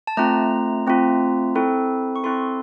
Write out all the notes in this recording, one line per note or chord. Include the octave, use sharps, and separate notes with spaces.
A5
A3 C4 F4 A#5
A3 C4 F4
C4 E4 A4
C#6
C4 E4 A4 C6